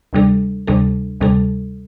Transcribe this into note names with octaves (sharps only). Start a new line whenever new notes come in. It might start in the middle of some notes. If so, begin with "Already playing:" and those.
D2 C3 G3 D4 A4
D2 C3 G3 D4 A4
D2 C3 G3 D4 A4